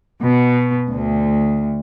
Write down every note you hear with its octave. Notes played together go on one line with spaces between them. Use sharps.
B2
D2